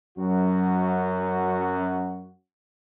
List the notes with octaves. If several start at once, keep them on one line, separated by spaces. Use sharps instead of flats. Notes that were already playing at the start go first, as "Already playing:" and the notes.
F#2 F#4